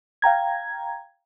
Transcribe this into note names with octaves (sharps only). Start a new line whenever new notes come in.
F5 G5 A#5 G#6